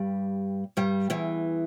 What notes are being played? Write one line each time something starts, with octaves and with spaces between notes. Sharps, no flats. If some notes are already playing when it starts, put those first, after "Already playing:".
Already playing: G2 G3
G2 G3
E2 E3